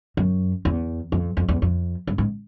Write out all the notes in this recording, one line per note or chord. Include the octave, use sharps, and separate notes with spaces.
F#2
E2
F2
F2
E2
F2
G2
G#2